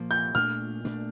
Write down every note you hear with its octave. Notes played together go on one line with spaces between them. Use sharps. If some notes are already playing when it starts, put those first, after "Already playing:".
Already playing: A#2 F3 A#3
G6
A#2 A3 D4 F6
A#2 A3 D4